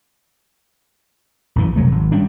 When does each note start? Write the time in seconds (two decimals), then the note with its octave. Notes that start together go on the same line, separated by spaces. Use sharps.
1.56 A#1 F#2 E3
1.76 C3 F3 F#3 A3
1.92 G#1
2.12 G3 C#4 D4